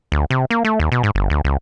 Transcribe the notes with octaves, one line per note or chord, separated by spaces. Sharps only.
D2
C3
A#3
A3
D#2
B2
G#2
G1
D2
C#2